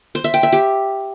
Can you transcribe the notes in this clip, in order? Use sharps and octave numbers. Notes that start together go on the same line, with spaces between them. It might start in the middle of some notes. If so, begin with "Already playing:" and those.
C5
E5
G5
E5
G4